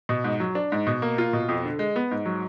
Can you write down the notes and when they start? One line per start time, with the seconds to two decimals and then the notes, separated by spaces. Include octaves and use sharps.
0.09 B2
0.24 G#2
0.40 F#3
0.55 D4
0.72 G#2
0.87 B2
1.02 A#3
1.18 F4
1.33 B2
1.49 F2
1.65 D3
1.79 G#3
1.96 B3
2.11 G#2
2.25 F#3